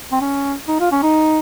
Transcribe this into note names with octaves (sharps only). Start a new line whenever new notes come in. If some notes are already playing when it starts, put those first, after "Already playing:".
C4
C#4
D#4
F4
C#4
D#4